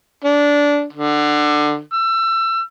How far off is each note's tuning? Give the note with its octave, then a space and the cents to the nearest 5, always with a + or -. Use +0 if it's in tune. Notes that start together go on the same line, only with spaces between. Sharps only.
D4 -15
D3 +20
E6 +25